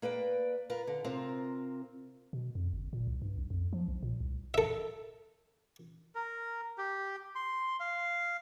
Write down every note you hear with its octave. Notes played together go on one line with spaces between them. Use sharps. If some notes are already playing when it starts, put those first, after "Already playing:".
A#3 B4 D5 G5
F4 A#4 B4
D3
C3 C4 F4 A#4
B2
F2
G1
A#2
C2
G2
B1
F2
F3
B1
A#2
C2
A4 E5
A#4
G4
C6
F5